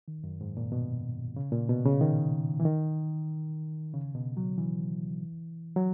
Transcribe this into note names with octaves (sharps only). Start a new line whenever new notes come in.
D#3
F#2
G#2
A#2
B2
C#3
A#2
B2
C#3
D#3
E3
D#3
C#3
B2
F#3
E3
F#3